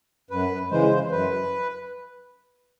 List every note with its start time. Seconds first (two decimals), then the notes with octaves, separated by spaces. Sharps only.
0.31 F#2 B4
0.70 C#3 E3 G#3 C5
1.11 F#2 B4